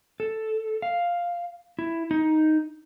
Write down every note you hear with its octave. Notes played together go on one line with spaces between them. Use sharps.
A4
F5
E4
D#4